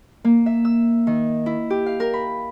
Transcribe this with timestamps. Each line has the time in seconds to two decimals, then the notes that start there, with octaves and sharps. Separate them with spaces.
0.24 A#3
0.46 E5
0.65 E6
1.07 D#3
1.46 E4
1.70 G4
1.86 F5
2.00 A#4
2.14 B5